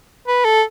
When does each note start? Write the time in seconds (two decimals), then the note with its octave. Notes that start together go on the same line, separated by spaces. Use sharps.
0.28 B4
0.44 A4